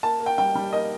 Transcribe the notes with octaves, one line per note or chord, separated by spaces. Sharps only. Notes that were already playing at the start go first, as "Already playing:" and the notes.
A#3 A5
A#3
G5
G3 G5
G3
A#3 D#5